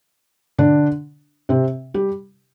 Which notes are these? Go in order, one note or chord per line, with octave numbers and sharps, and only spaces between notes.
D3 D4
C3 C4
G3 G4